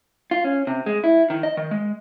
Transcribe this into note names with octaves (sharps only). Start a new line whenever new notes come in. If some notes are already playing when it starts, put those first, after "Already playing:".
F4
C#4
C3
G#3
E4
D#3
D#5
D#3
G#3